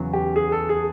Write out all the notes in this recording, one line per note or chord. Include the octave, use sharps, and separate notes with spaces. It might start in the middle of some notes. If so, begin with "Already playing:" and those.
Already playing: E2 C#3 F#3
G4
G#4
A4
G#4